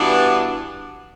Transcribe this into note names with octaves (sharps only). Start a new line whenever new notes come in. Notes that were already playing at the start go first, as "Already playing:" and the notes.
Already playing: G2 E3 B3 D4 F#4